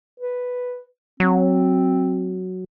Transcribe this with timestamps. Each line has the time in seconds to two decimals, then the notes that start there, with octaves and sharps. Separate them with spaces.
0.20 B4
1.20 F#3 C4